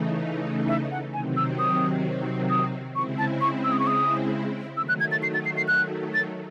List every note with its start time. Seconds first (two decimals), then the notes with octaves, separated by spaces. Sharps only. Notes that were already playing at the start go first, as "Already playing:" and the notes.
Already playing: C#3 E3 A3 D#4
0.68 E5
0.91 F#5
1.13 C3 D#3 F#3 C4 G#5
1.37 E6
1.59 D#6
2.50 D#6
2.95 C#3 G#3 C4 E4 C#6
3.18 A5
3.41 C#6
3.64 E6
3.72 D#6
3.80 C#6
3.87 D#6
4.77 D#3 F#3 A3 E6
4.89 F#6
5.00 G#6
5.12 A6
5.23 C7
5.34 A6
5.45 C7
5.57 C7
5.68 F#6
6.14 A6